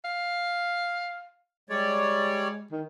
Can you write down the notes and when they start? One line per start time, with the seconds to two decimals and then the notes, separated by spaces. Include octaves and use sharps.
0.05 F5
1.70 G3 G#3 C#5 D5
2.72 D#3